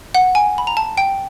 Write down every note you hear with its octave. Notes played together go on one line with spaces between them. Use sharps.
F#5
G#5
B5
A#5
A5
G5